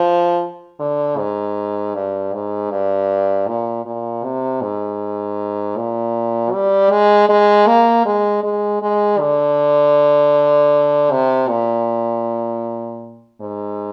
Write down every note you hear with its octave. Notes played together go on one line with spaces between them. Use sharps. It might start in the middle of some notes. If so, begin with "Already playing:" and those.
Already playing: F3
D3
G#2
G2
G#2
G2
A#2
A#2
C3
G#2
A#2
G3
G#3
G#3
A#3
G#3
G#3
G#3
D3
C3
A#2
G#2